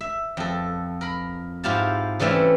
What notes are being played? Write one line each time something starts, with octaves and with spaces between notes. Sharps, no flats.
E5
F2 A4
A#4 B5
G#2 E4 F4 G4 F5 A5
C#3 E3 G3 A3 C4 C#4